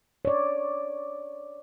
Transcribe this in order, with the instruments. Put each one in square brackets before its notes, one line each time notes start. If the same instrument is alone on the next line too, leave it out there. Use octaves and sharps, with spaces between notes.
[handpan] C#5 D5